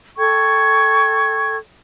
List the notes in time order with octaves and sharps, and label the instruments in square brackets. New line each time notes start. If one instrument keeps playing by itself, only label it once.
[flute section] A4 G5 C#6 G#6